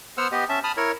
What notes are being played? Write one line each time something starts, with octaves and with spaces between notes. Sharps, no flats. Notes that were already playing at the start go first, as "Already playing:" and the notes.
B3 C5 F#5 E6 F6
B3 G4 D#5
C#4 E5 A5
A5 B5 D#6 F6
E4 A#4 C#5